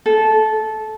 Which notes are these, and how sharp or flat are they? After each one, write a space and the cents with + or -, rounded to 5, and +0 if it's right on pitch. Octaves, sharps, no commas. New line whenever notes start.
A4 -15